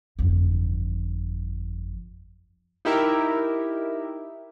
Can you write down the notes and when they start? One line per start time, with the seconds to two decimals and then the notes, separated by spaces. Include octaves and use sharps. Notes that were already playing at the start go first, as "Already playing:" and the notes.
0.19 G1 F2
2.85 D#4 E4 G4 A#4 E5